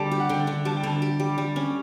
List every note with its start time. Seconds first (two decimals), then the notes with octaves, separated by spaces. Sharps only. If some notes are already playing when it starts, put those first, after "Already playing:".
Already playing: D3 G3 D5 A5
0.12 G4
0.20 F#5
0.29 D3 G5
0.47 D3
0.65 G3 A5
0.77 G5
0.83 D3 A5
1.02 G4
1.20 G3
1.38 G3
1.56 C#4